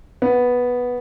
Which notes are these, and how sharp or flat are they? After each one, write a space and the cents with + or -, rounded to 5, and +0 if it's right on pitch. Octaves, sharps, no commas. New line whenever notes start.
B3 -5